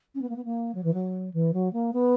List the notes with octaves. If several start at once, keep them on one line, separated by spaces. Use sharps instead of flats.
C#4
B3
A#3
B3
A#3
F#3
E3
F#3
E3
F#3
A#3
B3